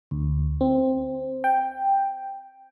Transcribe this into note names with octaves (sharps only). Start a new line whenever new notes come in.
D2
C4
G5